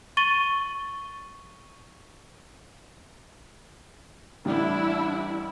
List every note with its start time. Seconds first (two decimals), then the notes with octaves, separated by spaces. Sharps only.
0.17 C#6 A6 D#7 G7
4.45 A1 G3 D4 E4